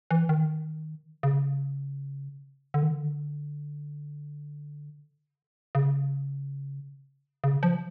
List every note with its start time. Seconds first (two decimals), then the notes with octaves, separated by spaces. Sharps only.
0.11 E3
0.29 D#3
1.23 C#3
2.74 D3
2.83 D#3
2.92 D3
5.75 C#3
7.44 C#3
7.63 F3